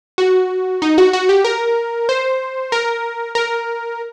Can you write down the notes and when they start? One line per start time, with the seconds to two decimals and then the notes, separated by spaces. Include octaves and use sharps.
0.18 F#4
0.82 D#4
0.98 F#4
1.13 F#4
1.29 G4
1.45 A#4
2.09 C5
2.72 A#4
3.35 A#4